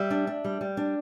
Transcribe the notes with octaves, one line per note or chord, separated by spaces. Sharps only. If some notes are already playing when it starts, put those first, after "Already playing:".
Already playing: G3 E5
D4
D4
G3
G3
D4